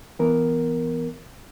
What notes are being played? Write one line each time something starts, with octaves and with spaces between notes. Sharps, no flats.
E3 B3 A#4